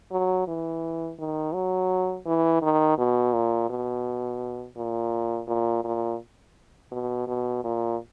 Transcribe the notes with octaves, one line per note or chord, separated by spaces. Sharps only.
F#3
E3
D#3
F#3
E3
D#3
B2
A#2
B2
A#2
A#2
A#2
B2
B2
A#2